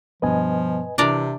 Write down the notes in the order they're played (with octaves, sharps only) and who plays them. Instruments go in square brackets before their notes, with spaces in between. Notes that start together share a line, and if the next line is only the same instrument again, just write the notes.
[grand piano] G2 B2 B3 [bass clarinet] F3 [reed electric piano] B4 D#5 G#5
[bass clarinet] C3 [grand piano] E3 E4 [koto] D4 A#4 D5